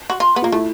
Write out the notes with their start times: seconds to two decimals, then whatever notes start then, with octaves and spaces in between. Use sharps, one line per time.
0.10 F#4
0.20 F4
0.36 B3
0.42 A#3 F4
0.52 A3 E4